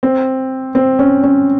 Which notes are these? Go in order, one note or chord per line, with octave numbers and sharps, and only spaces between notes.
C4
C4
C#4
C#4